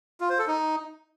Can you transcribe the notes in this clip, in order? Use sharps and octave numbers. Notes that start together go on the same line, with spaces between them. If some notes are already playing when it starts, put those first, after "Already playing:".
F4
C5
A4
D#4